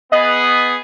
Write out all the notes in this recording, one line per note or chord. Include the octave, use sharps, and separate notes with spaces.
B3 G#4 D#5